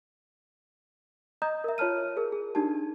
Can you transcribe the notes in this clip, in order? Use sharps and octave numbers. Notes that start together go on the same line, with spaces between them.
D#5 A#5 D#6 G6
A#4 E5
F4 C#5 A5 F6 D#7
G#4 A#4
G#4
D4 D#4 G4 A5